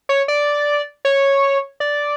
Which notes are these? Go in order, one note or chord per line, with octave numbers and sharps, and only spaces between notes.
C#5
D5
C#5
D5